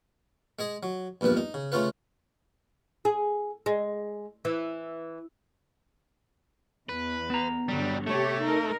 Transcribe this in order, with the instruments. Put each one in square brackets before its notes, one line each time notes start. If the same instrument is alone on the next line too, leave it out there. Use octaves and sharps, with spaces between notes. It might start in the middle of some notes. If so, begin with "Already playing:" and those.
[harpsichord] G#3 G#4 D#5
F#3
A#1 E2 G2 A#2 B4
D#4
C#3
C#3 A3 C#4 F4 B4
[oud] G#4
G#3
E3
[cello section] E2 [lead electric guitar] B4
[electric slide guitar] B3 A#5
[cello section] G2 D3 [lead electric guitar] F#3 G3
[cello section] C3 G4 C#5 [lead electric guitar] A3
[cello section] D#4 A#4